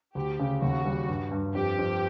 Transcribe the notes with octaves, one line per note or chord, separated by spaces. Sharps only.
D2 G4
C#3
D#2 F#4
G3
G2
G2
F2 G4
F2